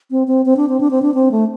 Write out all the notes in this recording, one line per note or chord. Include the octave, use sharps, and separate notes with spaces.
C4
C4
C4
D4
C4
D4
C4
D4
C4
A3